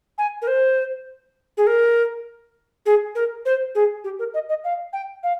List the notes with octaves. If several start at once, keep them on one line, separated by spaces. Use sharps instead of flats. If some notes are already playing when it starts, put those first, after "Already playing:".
G#5
A#4
C5
G#4
A#4
G#4
A#4
C5
G#4
G4
A#4
D#5
D#5
F5
G5
F5